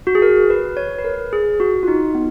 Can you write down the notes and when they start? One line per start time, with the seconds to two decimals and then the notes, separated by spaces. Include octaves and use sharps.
0.07 F#4
0.15 G#4
0.22 A#4
0.50 B4
0.77 C#5
0.99 B4
1.05 A#4
1.33 G#4
1.60 F#4
1.83 F4
1.88 D#4
2.15 B3